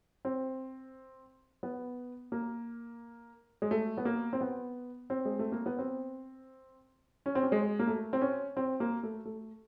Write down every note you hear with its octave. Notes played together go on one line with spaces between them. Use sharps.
C4
B3
A#3
G#3
A3
B3
A#3
C4
B3
C4
G#3
A3
A#3
B3
C4
C#4
C4
C#4
G#3
A#3
A3
C4
C#4
C4
A#3
A3
A3